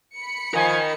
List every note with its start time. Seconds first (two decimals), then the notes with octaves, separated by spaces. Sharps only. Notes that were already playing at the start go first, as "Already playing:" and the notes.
0.16 B5 C#7
0.54 F3 A#4 D#5 G#5